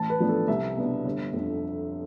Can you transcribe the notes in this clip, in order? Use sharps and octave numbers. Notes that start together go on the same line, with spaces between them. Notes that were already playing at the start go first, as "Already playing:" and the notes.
Already playing: A1 A5
B4
A2 F3 B3 D4
A4
C2 E5
B2 B3 D4
G1
F2 D3